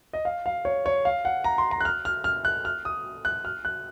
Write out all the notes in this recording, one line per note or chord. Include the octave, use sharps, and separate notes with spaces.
D#5
F5
F5
C#5
C#5
F5
F#5
A#5
C6
A#5
F#6
F6
F6
F6
F#6
F6
D#6
F#6
F6
F#6